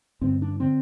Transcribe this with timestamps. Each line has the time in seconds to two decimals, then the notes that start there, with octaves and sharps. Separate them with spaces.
0.21 G2 D3 C4
0.42 D4
0.60 D3 C4